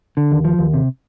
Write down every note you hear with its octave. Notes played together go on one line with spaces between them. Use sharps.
D3
D#2
F3
D#2
C3